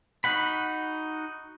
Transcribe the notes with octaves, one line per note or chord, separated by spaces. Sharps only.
D#4 F#4 F#5 B5